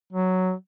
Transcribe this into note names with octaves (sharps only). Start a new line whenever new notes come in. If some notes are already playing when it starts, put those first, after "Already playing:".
F#3